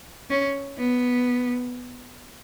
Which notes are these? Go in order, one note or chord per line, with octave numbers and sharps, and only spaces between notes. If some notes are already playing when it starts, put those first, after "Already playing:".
C#4
B3